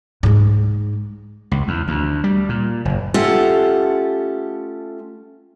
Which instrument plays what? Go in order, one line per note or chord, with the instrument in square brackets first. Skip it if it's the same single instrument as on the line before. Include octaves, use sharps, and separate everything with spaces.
[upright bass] G#2 G#3
[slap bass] C#2
E2
D2
G3
A#2
F#1
[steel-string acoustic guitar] A3 C#4 F4 G4 A4 F#5